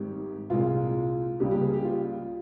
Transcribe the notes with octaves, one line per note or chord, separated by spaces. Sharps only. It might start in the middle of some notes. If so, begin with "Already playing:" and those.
Already playing: G#1 G#2 G3 G4
C2 A#2 G#3 F4
C#2 C#3 G3 A#3 G4
G4
G#4
G4
F4